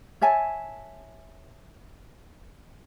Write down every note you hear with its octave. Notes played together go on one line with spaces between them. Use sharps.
C#5 E5 G#5 A5